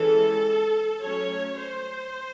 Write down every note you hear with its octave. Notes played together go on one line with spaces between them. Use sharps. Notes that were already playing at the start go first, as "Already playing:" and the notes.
Already playing: E3 G#3 C#4 A4
F#3 A3 C#4 C#5
C5